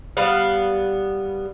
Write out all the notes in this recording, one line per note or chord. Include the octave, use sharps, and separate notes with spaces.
G3 B3 F5